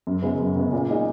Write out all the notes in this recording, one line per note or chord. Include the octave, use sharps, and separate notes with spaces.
F#2
C#3 G#3 B3
F#2
C#3 G#3 B3
A#2
G#3 D#4 G#4